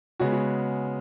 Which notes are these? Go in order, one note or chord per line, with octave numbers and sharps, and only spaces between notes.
C#3 G#3 B3 F#4
F#4